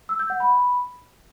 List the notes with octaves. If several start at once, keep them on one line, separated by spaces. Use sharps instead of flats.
E6
G6
F#5
B5